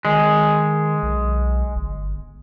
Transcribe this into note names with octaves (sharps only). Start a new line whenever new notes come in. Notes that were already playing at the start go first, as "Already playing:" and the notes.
D#3 G#3
B1
G1